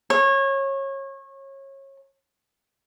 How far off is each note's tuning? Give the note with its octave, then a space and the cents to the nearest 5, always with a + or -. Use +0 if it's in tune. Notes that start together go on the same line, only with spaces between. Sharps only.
C#5 -25